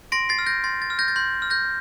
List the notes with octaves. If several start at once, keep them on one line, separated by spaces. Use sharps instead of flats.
C6 A#6 D7
A6 C7
F6
G6 A#6
C6 A6
A6
F6
G6 A#6
A6
C6 G6
F6
G6 A#6